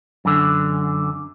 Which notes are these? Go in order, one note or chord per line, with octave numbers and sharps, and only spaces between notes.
F#2 D3